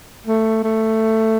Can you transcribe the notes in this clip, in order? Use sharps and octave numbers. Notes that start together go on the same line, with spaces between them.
A3
A3